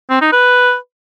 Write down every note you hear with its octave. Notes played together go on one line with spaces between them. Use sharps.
C4
D#4
B4